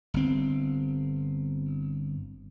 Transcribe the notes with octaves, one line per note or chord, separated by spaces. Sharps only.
G1 C4